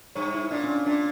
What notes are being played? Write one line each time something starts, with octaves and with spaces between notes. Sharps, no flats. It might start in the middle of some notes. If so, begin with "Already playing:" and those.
G2 C#5
E4
A#2 D4
C#4
D4
A#2 D4